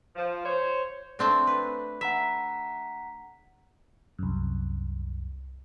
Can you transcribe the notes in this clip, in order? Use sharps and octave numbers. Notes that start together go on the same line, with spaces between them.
F3
C5 C#5
A3 C4 D4
B4
E5 F#5 A#5 B6
C2 F#2